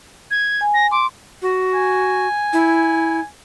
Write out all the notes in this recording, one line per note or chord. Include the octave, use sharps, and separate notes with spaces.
G#6
G#5
A#6
C6 D6
F#4
G#5
E4